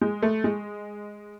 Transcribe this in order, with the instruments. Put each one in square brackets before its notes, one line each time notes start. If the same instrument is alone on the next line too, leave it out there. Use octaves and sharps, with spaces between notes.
[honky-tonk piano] G#3
A3
G#3